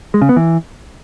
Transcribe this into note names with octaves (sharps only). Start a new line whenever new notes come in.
G#3
C#3
B3
E3